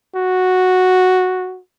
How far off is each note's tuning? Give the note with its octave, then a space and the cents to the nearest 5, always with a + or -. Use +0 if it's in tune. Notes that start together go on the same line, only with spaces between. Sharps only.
F#4 -5